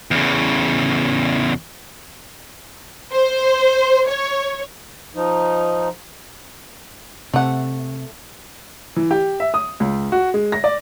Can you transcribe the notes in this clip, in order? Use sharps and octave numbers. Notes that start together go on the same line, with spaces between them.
E2 C#3
C5
C#5
F3 D#4
C3 A3 F#5
E3
G4
E5
D#6
C#2
F#4
G#3
A#6
D5